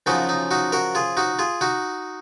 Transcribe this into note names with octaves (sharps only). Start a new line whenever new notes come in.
F#2 C#3 F3 D#4 F#4
D#4
D#4 F#4
F#4 A#4
F4 G#4
D#4 F#4
F4 G#4
D#4 F#4